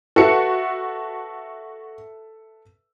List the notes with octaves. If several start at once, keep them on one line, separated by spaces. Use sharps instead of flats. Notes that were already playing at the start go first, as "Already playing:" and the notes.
F#4 A4 B4 E5 C#7